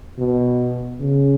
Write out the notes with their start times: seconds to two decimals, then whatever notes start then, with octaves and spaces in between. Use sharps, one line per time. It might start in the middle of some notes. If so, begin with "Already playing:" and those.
0.19 B2
1.01 C#3